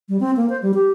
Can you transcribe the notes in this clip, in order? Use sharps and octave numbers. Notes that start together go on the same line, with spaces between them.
G3
C4
A#3
C5
G3
G4